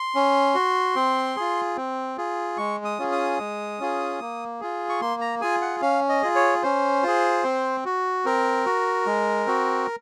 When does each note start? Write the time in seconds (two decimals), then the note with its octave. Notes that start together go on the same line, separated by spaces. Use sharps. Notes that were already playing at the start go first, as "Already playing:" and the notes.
Already playing: C6
0.15 C#4
0.55 F#4
0.96 C4
1.36 F4 G#4
1.76 C4
2.17 F4 G#4
2.58 G#3 C#6
2.85 D#6
2.98 C#4 F4 G#4
3.12 D#6
3.39 G#3
3.79 C#4 F4 G#4
4.20 A#3
4.61 F4 G#4
4.89 C#6
5.01 A#3 C6
5.21 A#5
5.41 F4 G#4 G#5
5.62 F#5
5.81 C#4 F5
6.09 D#5
6.22 F4 G#4
6.36 C#5
6.63 C#4 C5
7.03 F4 G#4
7.44 C4
7.85 F#4
8.25 C4 A#4
8.66 F#4
9.06 G#3
9.46 C4 F#4